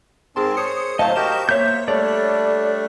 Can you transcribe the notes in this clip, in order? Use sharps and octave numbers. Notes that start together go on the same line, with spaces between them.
G#2 C4 G#4 A#4 A5 C6
C5 C#5 D#6 C#7
A2 F#3 A3 C5 D#5 F5 A5
F#4 G4 A#4 C#6 G6 E7
A#3 C5 C#5 E5 G6
G3 A3 D4 A4 C#5 D5